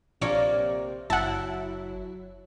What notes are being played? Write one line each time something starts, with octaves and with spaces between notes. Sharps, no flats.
A#1 C3 A#3 C#5 D5
F#1 F#3 E4 F#5 A5